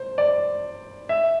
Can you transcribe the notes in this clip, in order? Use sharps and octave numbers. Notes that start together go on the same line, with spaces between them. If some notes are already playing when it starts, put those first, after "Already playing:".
Already playing: C5
D5
E5